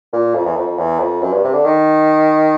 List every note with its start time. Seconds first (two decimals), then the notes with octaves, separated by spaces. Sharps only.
0.13 A#2
0.35 F2
0.46 E2
0.56 F2
0.67 F2
0.78 E2
1.00 F2
1.22 F#2
1.32 G2
1.44 C3
1.54 D3
1.65 D#3